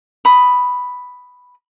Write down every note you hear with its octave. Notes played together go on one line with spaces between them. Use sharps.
B5 D#6